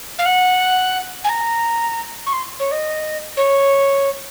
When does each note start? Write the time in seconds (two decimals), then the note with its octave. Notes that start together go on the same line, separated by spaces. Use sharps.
0.19 F5
0.25 F#5
1.24 G#5
1.29 A#5
2.26 C#6
2.33 C6
2.59 C#5
2.72 D#5
3.37 C#5